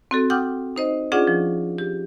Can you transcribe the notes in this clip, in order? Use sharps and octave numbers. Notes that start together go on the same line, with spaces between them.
C4 F#4 A4
F#5 G5 D6 D#6 F6 G6
D#4 C5 D#5
C#4 D4 F4 G#4 D5 F#5
F3
G4